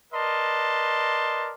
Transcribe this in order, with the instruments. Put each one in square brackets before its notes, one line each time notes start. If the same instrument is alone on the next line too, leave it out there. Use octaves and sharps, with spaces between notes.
[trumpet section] A#4 B4 D5 D#5 A5 C6